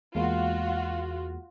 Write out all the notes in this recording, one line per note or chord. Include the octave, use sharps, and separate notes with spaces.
E2 G#3 A#3 F4 F#4